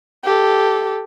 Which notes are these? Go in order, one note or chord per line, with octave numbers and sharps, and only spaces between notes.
G4 A4